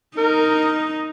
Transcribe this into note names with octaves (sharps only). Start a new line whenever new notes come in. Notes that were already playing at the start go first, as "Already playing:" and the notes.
D#4 A#4